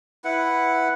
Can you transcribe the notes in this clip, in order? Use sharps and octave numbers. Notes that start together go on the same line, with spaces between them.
E4 B4 F#5